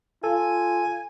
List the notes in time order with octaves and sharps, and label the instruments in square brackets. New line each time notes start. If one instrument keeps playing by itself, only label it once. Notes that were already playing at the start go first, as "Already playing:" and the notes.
[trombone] F4 [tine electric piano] A4 [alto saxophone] G#5